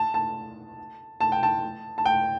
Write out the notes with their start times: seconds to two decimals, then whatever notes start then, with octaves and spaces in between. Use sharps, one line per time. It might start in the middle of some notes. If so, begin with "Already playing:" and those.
Already playing: A5
0.14 A5
1.21 A5
1.32 G5
1.43 A5
1.98 A5
2.05 G5